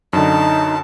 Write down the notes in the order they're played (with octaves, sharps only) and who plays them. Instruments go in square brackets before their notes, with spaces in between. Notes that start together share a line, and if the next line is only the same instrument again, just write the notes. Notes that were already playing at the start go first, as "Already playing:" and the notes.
[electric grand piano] F#2 D3 [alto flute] D#4 [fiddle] A5